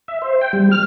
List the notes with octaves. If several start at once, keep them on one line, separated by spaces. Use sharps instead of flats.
E5
C5
G5
G3
F6